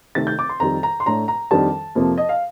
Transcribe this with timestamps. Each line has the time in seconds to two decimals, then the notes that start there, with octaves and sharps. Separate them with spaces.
0.15 C3 D#3 A3 C4 D#4 A6
0.27 G6
0.39 D6
0.49 C6
0.60 F2 D#3 G3 A#5
0.83 A#5
1.00 C6
1.06 A2 A3 D4 A#5
1.28 A#5
1.51 F2 D#3 G3 D4 A5
1.95 F2 C3 F3 A#3
2.18 D#5
2.29 F5